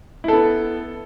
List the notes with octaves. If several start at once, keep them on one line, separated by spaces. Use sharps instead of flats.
B3 E4 A4